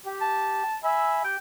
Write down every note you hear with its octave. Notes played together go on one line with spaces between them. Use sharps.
G4
A5
E5 G#5 B5 E6
G4 G5